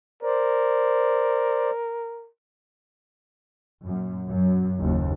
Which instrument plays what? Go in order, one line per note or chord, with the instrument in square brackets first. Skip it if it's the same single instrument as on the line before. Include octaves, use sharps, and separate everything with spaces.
[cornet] A#4 [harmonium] C5 D5
[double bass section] F#2 A#2
F#2 F#3
F#1 D#2